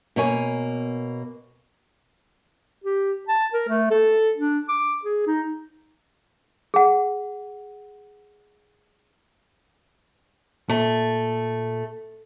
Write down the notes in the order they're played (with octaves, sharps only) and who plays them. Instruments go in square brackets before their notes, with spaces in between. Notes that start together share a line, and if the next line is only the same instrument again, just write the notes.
[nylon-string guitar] B2 A#3 C#5 G#5
[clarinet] G4
A5
A#4
A3
A4
D4
D6
G#4
D#4
[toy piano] G#4 F#5
[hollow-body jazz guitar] A#2 [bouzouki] A3